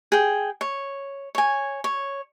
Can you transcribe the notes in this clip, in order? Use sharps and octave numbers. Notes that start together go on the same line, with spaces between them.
G#4 G5
C#5
C#5 G#5
C#5